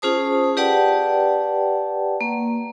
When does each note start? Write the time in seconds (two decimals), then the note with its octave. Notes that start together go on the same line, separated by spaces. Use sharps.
0.02 C#4 F4 G#4 C5 A5 D#6
0.57 G4 B4 D5 F#5 G5 A5
2.21 A#3